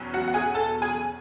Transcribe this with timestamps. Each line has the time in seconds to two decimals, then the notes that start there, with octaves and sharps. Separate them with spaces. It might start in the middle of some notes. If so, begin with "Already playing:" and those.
Already playing: E2 B2 F#3 C#4
0.14 F#4 F#5
0.28 F#5
0.34 G#4 G#5
0.54 A4 A5
0.82 G#4 G#5